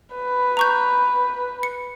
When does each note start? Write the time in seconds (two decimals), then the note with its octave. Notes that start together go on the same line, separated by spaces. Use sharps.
0.15 B4
0.57 A#5 C#6 G6
1.63 C#7